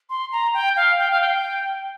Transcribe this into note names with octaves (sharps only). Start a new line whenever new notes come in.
C6
A#5
G5
F5
G5
F5
G5